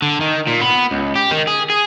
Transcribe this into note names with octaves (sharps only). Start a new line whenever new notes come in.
D3
D#3
A#2
B3
C#2
G4
D#3
G#4
G#4